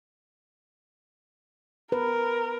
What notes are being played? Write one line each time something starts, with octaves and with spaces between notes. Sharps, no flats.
A#4 B4